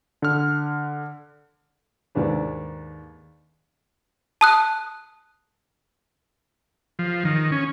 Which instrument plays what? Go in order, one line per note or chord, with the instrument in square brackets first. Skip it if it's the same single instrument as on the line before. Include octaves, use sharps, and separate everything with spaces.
[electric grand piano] D3 F6
[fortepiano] D#2 G#2 D4 B4
[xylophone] A5 D#6 F#6
[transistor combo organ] F3
D#3
C#4